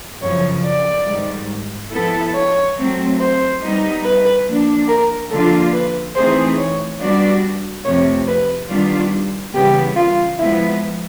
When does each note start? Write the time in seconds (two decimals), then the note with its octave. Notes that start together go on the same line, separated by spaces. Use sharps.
0.22 F#2 C#3 F3 C#5
0.65 D5
1.07 G#2 D#3 G3
1.91 F3 G#3 B3 E4 A4
2.34 C#5
2.76 F#3 A3 C4
3.19 C5
3.62 G3 B3 D#4
4.03 B4
4.46 F3 A#3 D4
4.88 A#4
5.31 D3 F3 A#3 D4 F4 A4
5.73 B4
6.15 E3 A3 C4 D#4 G#4 C5
6.58 C#5
7.00 G3 B3 D4 F#4 D5
7.85 F2 C3 F3 A3 C#5
8.27 B4
8.69 D#3 G3 B3 D4 F4
9.54 C#3 E3 G3 B3 G4
9.97 F4
10.39 F3 G#3 B3 E4